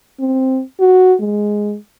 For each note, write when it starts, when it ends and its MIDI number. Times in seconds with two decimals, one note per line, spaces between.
0.20 0.61 60
0.80 1.14 66
1.20 1.76 56